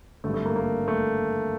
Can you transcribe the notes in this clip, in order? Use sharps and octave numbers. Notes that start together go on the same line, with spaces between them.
G#1 G2 D3 A3
A3
A#3
A#3
A3